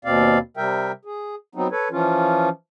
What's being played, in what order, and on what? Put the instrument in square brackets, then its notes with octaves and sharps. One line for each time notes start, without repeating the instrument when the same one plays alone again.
[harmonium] D#2 B2 C4 D5 F5
C3 G3 A#4 E5 G5
G#4
F#3 B3 C4 D#4
A4 B4 C#5
E3 F3 C#4 F4